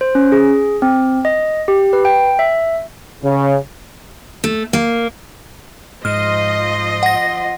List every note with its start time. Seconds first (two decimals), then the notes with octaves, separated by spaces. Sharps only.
0.01 C5
0.15 C#4
0.32 G#4
0.82 C4
1.25 D#5
1.68 G4
1.93 B4
2.05 G5
2.39 E5
3.23 C#3
4.44 A3
4.73 A#3
6.05 G#2 F3 D#5 C6 F6
7.03 F#5 A#6